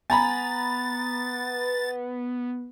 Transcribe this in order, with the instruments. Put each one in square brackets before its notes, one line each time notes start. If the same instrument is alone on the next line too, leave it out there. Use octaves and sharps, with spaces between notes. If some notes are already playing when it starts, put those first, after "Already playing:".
[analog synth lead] B3 [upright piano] G#5 A#5 B5 [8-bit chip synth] A6